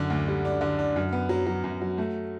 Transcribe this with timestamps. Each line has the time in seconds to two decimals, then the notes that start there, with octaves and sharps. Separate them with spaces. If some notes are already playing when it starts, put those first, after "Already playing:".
Already playing: F#2 D3
0.10 D2
0.28 G3
0.45 D4
0.61 D3
0.79 D4
0.96 F#2
1.13 B3
1.29 F#3
1.46 F#3
1.64 F#2
1.81 F#3
1.98 A3